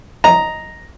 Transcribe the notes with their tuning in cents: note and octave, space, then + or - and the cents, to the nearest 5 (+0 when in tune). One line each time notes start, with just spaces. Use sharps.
D#5 +5 A#5 +0